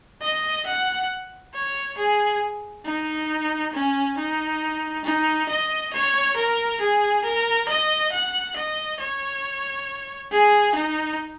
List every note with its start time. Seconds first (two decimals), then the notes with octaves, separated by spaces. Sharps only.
0.22 D#5
0.66 F#5
1.54 C#5
1.98 G#4
2.85 D#4
3.74 C#4
4.18 D#4
5.05 D#4
5.49 D#5
5.93 C#5
6.37 A#4
6.81 G#4
7.24 A#4
7.69 D#5
8.12 F#5
8.56 D#5
9.00 C#5
10.32 G#4
10.75 D#4